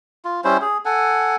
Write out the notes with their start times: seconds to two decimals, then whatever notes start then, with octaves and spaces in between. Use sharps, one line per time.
0.25 F4
0.44 G3 C#4 E4 C5
0.62 G#4
0.85 A4 F#5 G#5